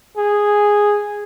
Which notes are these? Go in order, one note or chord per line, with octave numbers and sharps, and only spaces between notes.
G#4